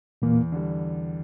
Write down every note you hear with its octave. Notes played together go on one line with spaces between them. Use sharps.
E2 A#2 A#3
D3 G3